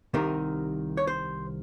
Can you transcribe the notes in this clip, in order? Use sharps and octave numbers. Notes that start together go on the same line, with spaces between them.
C2 C3 D#3 A#4
C#5
C5